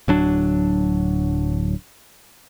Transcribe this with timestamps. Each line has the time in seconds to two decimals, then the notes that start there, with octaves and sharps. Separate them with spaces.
0.08 D1 F#3 D4